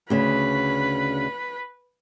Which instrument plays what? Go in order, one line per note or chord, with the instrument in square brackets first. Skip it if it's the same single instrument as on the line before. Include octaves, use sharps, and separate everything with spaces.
[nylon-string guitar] D2 C#3 [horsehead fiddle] B4